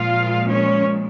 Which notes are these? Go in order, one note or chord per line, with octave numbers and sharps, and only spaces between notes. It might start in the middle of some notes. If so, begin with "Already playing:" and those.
Already playing: A#2 F3 G#3 F4 F5
C#4 C#5